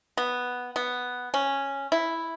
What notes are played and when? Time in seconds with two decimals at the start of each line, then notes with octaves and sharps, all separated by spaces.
0.17 B3
0.76 B3
1.34 C#4
1.92 E4